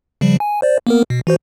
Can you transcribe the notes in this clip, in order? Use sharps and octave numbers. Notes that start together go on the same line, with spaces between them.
C#3 F3 G3
G#5
C5 D5
A#3 B3 A#4
B2
E3 F#4 C5